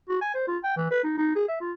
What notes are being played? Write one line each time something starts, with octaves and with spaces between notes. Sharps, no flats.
F#4
G#5
C5
F4
G5
E3
B4
D#4
D#4
G#4
E5
F4